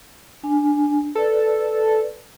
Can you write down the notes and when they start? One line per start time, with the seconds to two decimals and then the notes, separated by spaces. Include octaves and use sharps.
0.43 D4 G#5
1.15 A4 B4 D5